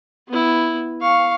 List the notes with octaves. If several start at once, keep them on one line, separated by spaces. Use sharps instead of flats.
B3 E4
F5 C#6